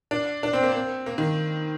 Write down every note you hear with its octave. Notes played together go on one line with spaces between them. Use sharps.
D4
D4
C4
A#3
C4
A#3
D#3